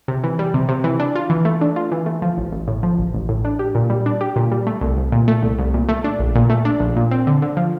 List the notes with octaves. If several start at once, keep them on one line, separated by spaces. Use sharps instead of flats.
C3
E3
G3
C3
C3
E3
D4
F4
E3
A3
D4
F4
E3
A3
F3
A1
A1
A2
F3
A1
A1
A2
D4
G4
A#2
G3
D4
G4
A#2
G3
A3
C2
C2
A#2
A3
C2
C2
A#2
A3
D4
A#1
A#2
A3
D4
A#1
A#2
C4
D3
D3
F3